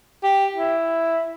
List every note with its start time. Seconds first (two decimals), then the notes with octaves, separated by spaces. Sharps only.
0.23 G4
0.55 E4